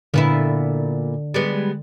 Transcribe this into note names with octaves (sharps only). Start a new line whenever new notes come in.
A#2 D3 B3 E4
G3 G#3 B3